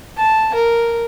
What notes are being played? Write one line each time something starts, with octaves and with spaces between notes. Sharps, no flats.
A5
A#4